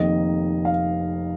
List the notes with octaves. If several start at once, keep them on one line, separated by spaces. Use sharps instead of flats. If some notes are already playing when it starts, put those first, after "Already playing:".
Already playing: F1 F2 D#3 A#3 D#5
F5